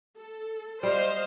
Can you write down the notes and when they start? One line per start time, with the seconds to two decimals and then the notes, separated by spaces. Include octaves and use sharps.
0.19 A4
0.83 G3 C5 D#5 F5